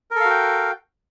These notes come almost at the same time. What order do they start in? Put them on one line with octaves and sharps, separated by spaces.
A#4 A4 F5 F#4 G5